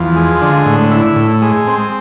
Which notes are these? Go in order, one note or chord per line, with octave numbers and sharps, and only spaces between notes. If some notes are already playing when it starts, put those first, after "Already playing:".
Already playing: E2 F3
G#3
D3
A2
E4
A2
G#3
C4